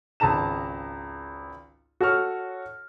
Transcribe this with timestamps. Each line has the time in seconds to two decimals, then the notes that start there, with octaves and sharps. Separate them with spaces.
0.20 G#1 C#2 A5 A#5 E7
2.01 F#4 A4 C#5 C#6 F6